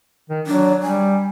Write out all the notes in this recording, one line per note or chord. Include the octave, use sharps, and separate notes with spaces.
D#3
F#3 D4
G3 G#5